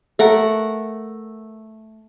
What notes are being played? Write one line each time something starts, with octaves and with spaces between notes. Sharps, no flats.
A3 A#4 F#5